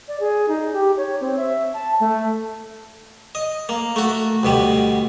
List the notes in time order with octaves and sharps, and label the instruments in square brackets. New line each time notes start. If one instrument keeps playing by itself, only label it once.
[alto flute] D5
G#4
D#4
G4
C#5
C4
E5
A5
A3
[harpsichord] D#5
A#3
A3 F#4
D2 B2 G3